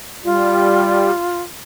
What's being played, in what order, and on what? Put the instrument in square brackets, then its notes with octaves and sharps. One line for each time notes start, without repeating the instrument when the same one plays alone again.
[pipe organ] G3 [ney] F4